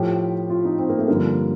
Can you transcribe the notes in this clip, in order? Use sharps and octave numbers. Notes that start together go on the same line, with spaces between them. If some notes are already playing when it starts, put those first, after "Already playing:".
Already playing: A2 F3 G4
F4
D#4
C4
A#3
A3
G2 D3 F3 A#3